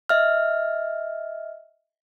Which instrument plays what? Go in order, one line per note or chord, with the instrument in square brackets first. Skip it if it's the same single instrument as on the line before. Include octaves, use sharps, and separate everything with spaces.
[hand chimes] D#5 E5 F6